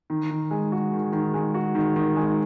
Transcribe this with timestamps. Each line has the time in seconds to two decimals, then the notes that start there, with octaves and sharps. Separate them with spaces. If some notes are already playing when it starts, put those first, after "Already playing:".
0.10 D#3
0.30 D#3
0.51 G#3
0.72 F#4
0.93 D#3
1.13 D#3
1.34 G#3
1.54 F#4
1.75 D#3
1.96 D#3
2.16 G#3